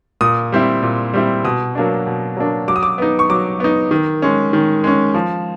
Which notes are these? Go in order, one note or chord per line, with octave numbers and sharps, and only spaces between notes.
A#2 D#6
G3 C4 E4
A#2
G3 C4 E4
B2 D#6
F#3 A#3 D4
B2
F#3 A#3 D4
F#3 D6
D#6
D6
B3 D#4
C#6
F#3 D6
B3 D#4
D#3
G#3 C#4
D#3
G#3 C#4
F3